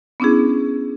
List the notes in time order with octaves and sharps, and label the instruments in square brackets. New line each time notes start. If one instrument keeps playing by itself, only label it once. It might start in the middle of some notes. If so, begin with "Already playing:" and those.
[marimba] B3 C#4 D4 E4 G#4